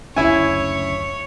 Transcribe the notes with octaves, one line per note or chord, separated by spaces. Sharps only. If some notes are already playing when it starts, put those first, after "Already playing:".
F#1 D2 C#4 E4 C#5 E5 G#5